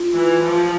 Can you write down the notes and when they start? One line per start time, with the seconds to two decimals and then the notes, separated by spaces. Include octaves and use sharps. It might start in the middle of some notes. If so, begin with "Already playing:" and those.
Already playing: F4
0.15 E3
0.44 F3